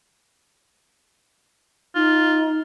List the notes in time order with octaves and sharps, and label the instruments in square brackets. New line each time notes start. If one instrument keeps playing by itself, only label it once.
[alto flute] D#4 [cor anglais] F4